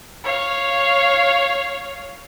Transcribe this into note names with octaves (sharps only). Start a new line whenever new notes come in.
C#5 F5